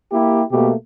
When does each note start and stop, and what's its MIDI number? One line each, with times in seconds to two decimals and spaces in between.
0.12 0.43 58
0.12 0.43 64
0.12 0.43 67
0.52 0.73 47
0.52 0.73 57
0.52 0.73 58
0.52 0.73 67